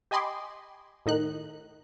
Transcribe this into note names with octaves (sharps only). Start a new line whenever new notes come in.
G4 D#5 G#5 B5 C6 D6
A2 D#3 D#4 F#6